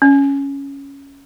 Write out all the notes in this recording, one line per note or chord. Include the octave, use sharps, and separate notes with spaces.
C#4